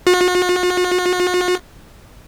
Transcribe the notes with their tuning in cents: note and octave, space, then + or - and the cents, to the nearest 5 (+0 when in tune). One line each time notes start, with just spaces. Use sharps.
F#4 -45